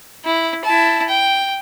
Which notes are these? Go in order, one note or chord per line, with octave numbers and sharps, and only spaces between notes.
E4
E4 A5
G5